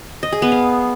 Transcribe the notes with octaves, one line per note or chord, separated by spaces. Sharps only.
D#5
G#4
B3
F5